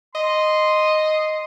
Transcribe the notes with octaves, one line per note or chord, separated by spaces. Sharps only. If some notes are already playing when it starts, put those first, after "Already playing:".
D#5 C6